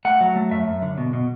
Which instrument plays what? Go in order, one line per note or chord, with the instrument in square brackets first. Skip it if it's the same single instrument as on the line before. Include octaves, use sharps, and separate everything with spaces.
[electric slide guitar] A3 F#5
F#3
A3
F#2 E5
F#2
D3
B2
B2